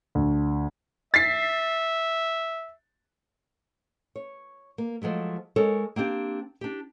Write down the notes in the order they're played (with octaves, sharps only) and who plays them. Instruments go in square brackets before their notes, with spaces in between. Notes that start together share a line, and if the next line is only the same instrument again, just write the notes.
[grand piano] D2
[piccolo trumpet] E5 [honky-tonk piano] A6 B6 C7
[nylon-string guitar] C#5
A#3
F3 F#3 G#3 A3
G#3 A4 A#4 C#5
A#3 C4 D4 G4
D4 G4